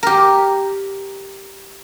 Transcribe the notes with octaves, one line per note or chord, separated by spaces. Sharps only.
G4 A#4